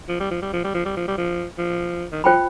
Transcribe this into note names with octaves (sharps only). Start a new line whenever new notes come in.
F3
G3
F3
G3
F3
G3
F3
G3
F3
G3
F3
F3
D#3
F3 F4 C5 G5 B5